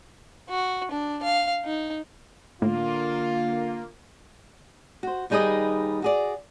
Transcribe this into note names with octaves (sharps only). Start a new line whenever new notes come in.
F#4
D4
F5
D#4
A2 D3 A#3 F4
F#4 C5
D#2 G3 D#4 G#4 B4 D#5
F#4 G#4 D5